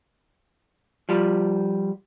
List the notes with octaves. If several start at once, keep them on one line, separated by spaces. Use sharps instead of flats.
F3 G3